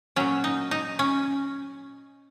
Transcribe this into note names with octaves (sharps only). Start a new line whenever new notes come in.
A#2 F#3 C#4
D#4
D#4
C#4